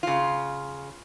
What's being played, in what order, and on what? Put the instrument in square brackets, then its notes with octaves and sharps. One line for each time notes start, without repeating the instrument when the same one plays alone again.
[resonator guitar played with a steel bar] C#3 F4